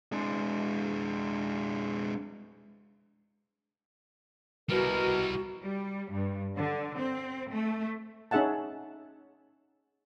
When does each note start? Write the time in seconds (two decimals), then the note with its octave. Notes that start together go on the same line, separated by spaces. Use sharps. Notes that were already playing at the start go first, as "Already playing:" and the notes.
0.12 G#3 D4
4.69 B2 G3 E4 F#4 A#4
5.63 G3
6.13 G2
6.56 D3
6.98 C4
7.52 A3
8.31 C#4 D#4 G#4 E5 F#5 A5